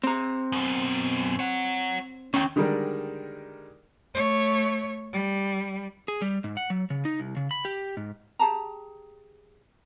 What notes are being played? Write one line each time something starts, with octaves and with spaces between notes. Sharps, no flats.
C4 A#5
F#2 B2
C#5 F#5
D#2 C#4 G5
D3 D#3 G3 G#3 A#4 D5
A3 C#5
G3
G#4
G3
G#2
F#5
F#3
C#3
D#4
C2
C#3
B5
G4
G#2
G4 G#4 A5 A#5